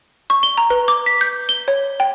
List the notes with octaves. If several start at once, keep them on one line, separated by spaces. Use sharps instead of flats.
C#6
G7
A#5
B4
D6
B6
G6
G7
C#5
G5